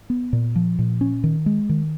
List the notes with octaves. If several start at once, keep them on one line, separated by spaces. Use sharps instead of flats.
B3
A#2
F3
A#2
C#4
D#3
G#3
D#3